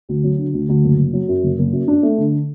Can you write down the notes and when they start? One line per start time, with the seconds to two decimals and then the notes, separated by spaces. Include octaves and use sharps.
0.09 D2
0.24 F#3
0.39 D3
0.54 D2
0.69 D2
0.84 F#1
0.98 F#1
1.13 F#3
1.28 F#2
1.43 F#1
1.59 F#1
1.73 F#2
1.88 D4
2.03 A3
2.18 D3